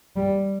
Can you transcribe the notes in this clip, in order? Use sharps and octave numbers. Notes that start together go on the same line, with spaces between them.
G3